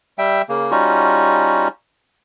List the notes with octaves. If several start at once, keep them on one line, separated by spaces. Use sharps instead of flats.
G3 E5 G5
C#3 A#3
G3 C#4 D#4 F4 F#4